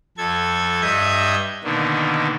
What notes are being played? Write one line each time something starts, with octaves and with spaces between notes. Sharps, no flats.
F2 A4 G#6
G2 D#5 E5 G6 G#6
B2 D3 D#3 A#3